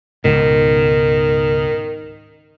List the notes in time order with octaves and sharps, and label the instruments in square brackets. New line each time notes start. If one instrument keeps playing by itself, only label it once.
[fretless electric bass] C#2 G#2 B2 [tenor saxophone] D#3